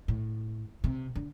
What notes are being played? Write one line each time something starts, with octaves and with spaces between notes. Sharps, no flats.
A2
C3
D3